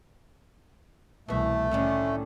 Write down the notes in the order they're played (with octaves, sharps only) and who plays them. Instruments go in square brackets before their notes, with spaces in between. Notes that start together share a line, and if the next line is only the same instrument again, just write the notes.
[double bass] C2 E3 [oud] B2 E5 [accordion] A3
[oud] A2 D3 D#3 [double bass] C#4